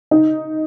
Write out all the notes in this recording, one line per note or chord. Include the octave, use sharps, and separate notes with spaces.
D#4